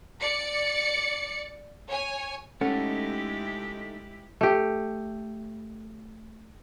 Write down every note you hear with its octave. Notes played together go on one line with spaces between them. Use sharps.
D5 C#7
C#5 G#5
G#3 A3 C#4 D#4 E4 G4 A4 F#5
A3 G4